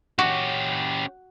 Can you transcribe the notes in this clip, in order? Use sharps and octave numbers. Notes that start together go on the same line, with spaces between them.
C#4 F#4 G4